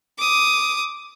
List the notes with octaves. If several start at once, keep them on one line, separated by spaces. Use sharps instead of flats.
D6 D#6